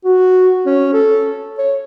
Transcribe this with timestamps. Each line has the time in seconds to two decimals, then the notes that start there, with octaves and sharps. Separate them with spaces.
0.05 F#4
0.66 C#4
0.93 A4
1.58 C#5